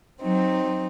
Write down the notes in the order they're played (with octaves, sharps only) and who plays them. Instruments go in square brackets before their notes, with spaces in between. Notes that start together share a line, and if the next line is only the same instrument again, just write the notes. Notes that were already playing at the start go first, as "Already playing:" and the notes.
[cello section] F#3 [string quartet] C4 D#4